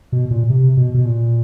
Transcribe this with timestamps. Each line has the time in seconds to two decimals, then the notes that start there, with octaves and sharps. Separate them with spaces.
0.12 B2
0.31 A#2
0.50 C3
0.77 B2
0.94 B2
1.05 A#2